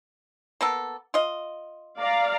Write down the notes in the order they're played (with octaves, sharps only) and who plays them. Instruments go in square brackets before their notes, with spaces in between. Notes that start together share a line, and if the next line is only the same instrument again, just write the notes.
[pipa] A#3 B3 A4
F4 D#5
[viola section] D5 F5 A#5